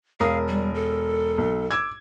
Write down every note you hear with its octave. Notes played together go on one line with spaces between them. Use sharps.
E1 A#4 F5 D#6
G3
A4
B1
D6 E6 G#6